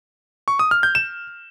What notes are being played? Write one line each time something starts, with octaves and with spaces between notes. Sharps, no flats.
C#6
D#6
F6
G6
E7